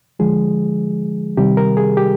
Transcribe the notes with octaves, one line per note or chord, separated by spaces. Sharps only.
D3 F3 G#3 G#4
C3 D#3 G3 G4
A#4
G#4
G4